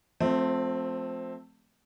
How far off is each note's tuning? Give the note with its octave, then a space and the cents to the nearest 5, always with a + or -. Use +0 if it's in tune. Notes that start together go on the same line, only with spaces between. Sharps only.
F3 +35 A3 +0 C4 +0